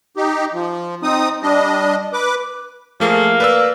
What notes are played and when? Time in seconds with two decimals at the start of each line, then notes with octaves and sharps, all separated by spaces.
0.17 D#4 G4
0.53 F3
1.03 C4 D#4 D#6
1.43 G3 D4 D#5
2.13 B4 D6
3.00 F3 A3 A#3 G#4
3.40 B4 D5 E6